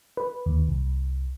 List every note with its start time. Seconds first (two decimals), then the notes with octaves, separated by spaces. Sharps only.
0.17 B4
0.46 D#2
0.68 C2